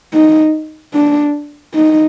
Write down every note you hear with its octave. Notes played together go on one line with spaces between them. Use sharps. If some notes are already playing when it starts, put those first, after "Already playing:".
D#4
D4
D#4